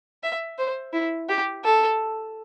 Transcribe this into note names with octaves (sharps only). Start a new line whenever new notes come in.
E5
C5
E4
G4
A4